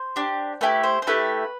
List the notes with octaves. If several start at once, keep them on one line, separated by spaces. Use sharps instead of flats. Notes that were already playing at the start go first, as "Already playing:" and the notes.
Already playing: C5
D4 G4
A3 E4 G4 B4
C5
C5
A3 E4 G4 B4